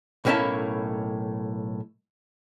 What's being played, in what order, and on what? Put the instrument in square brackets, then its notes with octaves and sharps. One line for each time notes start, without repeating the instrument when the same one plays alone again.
[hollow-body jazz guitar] B1 A2 A#3 C#4 E4 A5